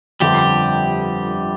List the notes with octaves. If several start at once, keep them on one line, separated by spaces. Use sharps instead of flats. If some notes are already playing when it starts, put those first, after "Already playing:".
G1 F2 D3 G3 G4